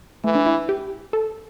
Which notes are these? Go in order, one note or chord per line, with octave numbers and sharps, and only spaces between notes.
E3 A3
D4
E4
G4
A4